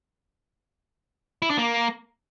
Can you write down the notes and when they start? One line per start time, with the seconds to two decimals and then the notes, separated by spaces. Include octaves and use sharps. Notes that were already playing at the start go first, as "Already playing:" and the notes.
1.42 E4
1.50 D4
1.58 A#3